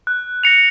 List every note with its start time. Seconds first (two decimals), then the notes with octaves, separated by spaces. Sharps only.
0.07 F#6
0.43 A#6 C#7 F7